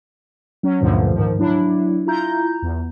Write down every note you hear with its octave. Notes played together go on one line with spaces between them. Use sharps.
F#3 C#4
D2 G2 A#2 D3 F3
G#2 D#3 F3
F#3 D4 E4
E4 F4 A#5 G6
E2